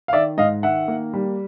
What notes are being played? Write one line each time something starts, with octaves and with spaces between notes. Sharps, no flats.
F5
D#3 D5 E5
G#2 D#5 F5
D#3 E5 F#5
A#3
G3